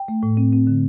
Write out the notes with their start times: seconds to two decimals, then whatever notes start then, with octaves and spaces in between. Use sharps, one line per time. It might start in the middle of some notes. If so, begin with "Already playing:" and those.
Already playing: G5
0.08 A3
0.23 A2
0.37 C4
0.53 C4
0.67 D3